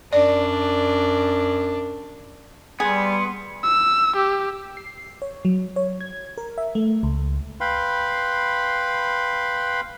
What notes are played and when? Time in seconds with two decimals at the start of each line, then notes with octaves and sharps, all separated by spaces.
0.13 F#2 D4 D5
2.80 G3 B3 G#4 C6
3.63 E6
4.16 G4
4.77 C7
5.22 C#5
5.45 F#3
5.76 C#5
6.01 G#6
6.38 A#4
6.58 E5
6.75 A3
7.03 C#2
7.61 B4 F5 G5 B5 C6